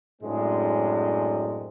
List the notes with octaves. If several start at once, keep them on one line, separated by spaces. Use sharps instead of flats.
F#2 A2 G#3 C4 D4